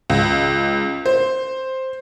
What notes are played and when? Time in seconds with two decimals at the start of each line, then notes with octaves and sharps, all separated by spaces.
0.10 C#2
1.06 C5